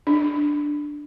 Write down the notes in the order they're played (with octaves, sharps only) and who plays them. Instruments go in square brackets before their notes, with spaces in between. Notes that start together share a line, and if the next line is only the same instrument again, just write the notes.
[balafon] D4